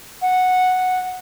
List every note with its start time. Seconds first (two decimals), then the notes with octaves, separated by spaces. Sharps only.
0.22 F#5